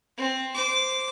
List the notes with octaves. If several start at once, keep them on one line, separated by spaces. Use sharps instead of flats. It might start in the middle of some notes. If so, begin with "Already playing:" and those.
C4
C5 D6